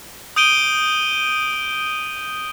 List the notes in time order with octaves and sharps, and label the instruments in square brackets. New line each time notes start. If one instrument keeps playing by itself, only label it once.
[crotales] D#6 G6 D7 D#7 G7